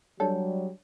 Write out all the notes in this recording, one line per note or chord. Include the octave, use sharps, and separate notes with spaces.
F#3 G3 D4 A4 C#5 D5